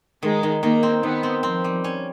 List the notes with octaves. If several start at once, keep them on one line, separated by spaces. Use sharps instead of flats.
D#3 G#3
D#3
D#3 A#3
C4
D#3 B3
C4
F3 C4
G3
C#4